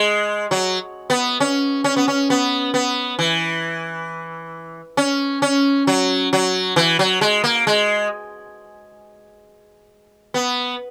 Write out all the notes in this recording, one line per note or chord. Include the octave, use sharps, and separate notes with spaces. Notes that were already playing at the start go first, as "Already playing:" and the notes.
Already playing: G#3
F#3
B3
C#4
C#4
B3
C#4
B3
B3
E3
C#4
C#4
F#3
F#3
E3
F#3
G#3
A#3
G#3
B3